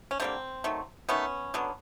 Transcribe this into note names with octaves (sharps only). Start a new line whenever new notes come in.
C#4
D3 G3 A#3 C4
D#3 F#3 A3
D#3 F#3 A3 B3 C#4
D3 F#3 B3